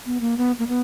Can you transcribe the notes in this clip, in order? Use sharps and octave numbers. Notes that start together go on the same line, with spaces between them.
B3
A#3
B3
A#3
B3